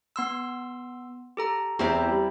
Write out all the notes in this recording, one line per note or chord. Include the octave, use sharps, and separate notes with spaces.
B3 C6 E6
G4 A4 A#5
E2 C4 E4 G4 A#5
G3